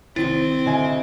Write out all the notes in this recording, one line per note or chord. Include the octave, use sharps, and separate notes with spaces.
C2 D#3 C4 E4 A6
D2 D#5 G#5